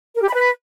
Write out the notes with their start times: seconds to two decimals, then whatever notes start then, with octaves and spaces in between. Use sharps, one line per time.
0.16 A#4
0.22 G4
0.28 B5
0.34 B4